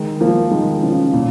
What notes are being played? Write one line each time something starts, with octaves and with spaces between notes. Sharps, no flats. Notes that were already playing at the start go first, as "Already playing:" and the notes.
Already playing: D#3 G#3
F3 A#3
D#3 G#3
C#3 F3
A#2